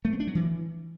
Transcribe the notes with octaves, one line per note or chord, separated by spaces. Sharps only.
A3
C4
D4
F#3
E3